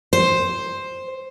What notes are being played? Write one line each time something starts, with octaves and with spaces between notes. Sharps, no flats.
C5